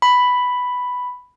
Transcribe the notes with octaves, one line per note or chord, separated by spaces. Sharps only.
B5